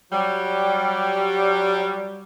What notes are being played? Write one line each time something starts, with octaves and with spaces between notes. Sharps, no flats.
F#3 G3